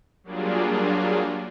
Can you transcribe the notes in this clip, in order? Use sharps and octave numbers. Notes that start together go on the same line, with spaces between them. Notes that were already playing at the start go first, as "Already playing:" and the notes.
F#3 G3 A#3 D4 F4 G#4